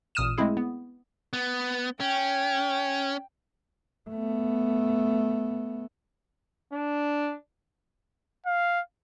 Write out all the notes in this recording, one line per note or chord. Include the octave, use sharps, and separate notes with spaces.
A1 A#2 D#6 F6 D#7 E7
G#3 A3 C4 E4 G#4
B3
B3
C#4 G5
A3 B3
D4
F5